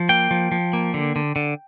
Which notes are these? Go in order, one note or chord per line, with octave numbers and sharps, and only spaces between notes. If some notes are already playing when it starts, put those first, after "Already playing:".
Already playing: F3
A#3 G5
F3
F3
A#3
D3
D3
D3